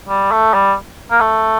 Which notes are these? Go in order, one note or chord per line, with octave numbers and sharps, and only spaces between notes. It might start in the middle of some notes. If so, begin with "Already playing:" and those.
G3
A3
G3
A#3
A3